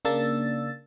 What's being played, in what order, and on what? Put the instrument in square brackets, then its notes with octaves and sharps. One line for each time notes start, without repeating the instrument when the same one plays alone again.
[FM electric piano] C#3 A#3 D4 E6 A6